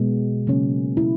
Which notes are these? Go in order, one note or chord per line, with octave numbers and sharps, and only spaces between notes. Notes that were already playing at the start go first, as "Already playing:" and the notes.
Already playing: B2 G#3 B3
C#3 F#3 A#3 C#4
E4